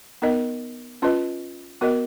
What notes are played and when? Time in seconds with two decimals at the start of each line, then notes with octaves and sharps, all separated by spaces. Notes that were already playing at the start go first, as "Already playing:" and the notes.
0.22 B3 D#4 A#4 D#5
1.02 C#4 F4 B4 D#5
1.81 B3 F#4 A#4 D#5